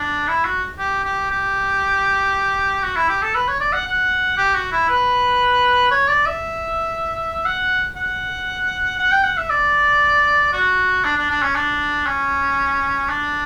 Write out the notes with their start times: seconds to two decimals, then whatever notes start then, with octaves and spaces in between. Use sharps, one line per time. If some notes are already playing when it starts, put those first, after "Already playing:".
Already playing: D4
0.28 E4
0.45 F#4
0.78 G4
1.04 G4
1.30 G4
2.83 F#4
2.96 E4
3.09 G4
3.22 A4
3.35 B4
3.48 C#5
3.60 D5
3.73 F#5
3.87 F#5
4.38 G4
4.55 F#4
4.72 E4
4.89 B4
5.91 C#5
6.08 D5
6.26 E5
7.45 F#5
7.96 F#5
8.99 F#5
9.12 G5
9.24 F#5
9.37 E5
9.50 D5
10.53 F#4
11.04 D4
11.17 D4
11.30 D4
11.42 C#4
11.55 D4
12.06 C#4
13.09 D4